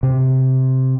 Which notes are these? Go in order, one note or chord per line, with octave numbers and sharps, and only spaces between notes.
C3